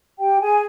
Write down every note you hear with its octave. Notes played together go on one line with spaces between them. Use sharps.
G4 G5
G#4 G#5